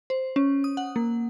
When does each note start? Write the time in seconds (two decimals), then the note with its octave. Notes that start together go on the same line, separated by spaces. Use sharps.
0.10 C5
0.36 C#4
0.64 D#6
0.77 F#5
0.96 A#3